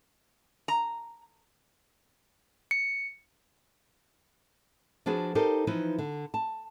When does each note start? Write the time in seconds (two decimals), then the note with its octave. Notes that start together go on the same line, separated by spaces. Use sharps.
0.68 A#5
2.71 C#7
5.06 F3 D4 F#4 G#4 B4
5.35 D#4 G4 A4 A#4 C5
5.67 E3 F3 D#4 E4 B4
5.98 D3
6.34 A5